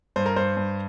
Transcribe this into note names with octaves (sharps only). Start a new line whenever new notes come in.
G2 C5
A#4
G2 C5
G2